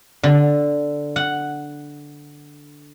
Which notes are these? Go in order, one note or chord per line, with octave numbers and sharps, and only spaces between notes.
D3
F#5